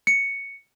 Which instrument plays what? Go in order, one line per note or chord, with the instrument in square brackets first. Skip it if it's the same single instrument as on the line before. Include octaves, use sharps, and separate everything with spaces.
[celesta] C#7